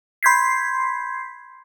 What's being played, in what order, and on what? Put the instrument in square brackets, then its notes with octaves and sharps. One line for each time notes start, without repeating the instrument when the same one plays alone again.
[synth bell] B5 C6 G6 G#6 B6 C7